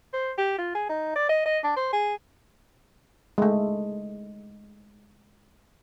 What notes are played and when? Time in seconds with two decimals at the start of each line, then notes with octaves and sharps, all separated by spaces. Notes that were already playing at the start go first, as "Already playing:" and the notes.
0.13 C5
0.38 G4
0.58 F4
0.75 G#4
0.89 D#4
1.16 D5
1.29 D#5
1.46 D#5
1.64 D4
1.76 C5
1.93 G#4
3.38 G#3 A3